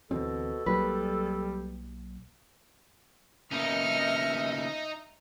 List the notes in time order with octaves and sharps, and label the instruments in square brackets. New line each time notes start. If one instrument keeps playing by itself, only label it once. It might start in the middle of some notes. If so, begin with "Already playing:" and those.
[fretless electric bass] D2 E3 C4 [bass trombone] B2 [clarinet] A4
[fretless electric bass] B1 F#3 A#3 [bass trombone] G3 [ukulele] B4
[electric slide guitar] C#3 A#3 B3 [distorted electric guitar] D#4 [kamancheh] E5 [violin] F6 C#7